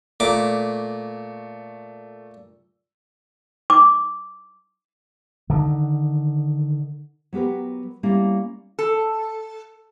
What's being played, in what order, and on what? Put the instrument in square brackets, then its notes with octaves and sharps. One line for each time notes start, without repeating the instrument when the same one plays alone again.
[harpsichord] A#2 D6 [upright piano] A3
[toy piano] D6
[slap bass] D3 D#3
[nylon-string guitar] F#3 B3 G4 A#4 B4
G3 A#3 C#4 E4
[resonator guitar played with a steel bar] A4